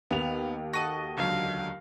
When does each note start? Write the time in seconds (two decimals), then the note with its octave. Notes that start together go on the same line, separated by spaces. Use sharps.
0.11 D#2 B3 F7
0.73 F#4 A4 D#5 A#6 D#7
1.17 C#2 D3 F#3 F5